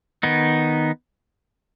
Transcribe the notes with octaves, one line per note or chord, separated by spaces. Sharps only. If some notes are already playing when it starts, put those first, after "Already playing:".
D#3 B3 D#4